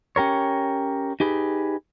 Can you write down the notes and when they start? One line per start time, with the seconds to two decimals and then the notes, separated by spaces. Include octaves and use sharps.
0.16 C#4 G4 A#4 C#5
1.20 D#4 G4 G#4 B4